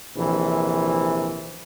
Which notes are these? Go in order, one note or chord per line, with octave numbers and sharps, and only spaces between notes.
A#1 C3 E3